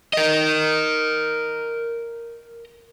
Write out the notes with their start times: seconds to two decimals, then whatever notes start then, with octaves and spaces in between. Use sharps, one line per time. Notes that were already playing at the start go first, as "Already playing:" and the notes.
0.13 A#4 D#5